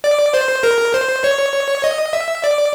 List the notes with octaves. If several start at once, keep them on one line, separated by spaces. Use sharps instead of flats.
D5
C5
A#4
C5
C#5
D#5
E5
D5